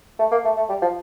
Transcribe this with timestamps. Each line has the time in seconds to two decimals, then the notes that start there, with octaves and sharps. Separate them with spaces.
0.19 A3
0.32 A#3
0.44 A3
0.56 A3
0.69 G3
0.82 F3